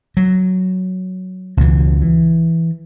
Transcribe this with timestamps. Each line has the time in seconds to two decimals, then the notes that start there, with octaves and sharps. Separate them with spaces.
0.17 F#3
1.57 C#2 B2 E3
2.02 E3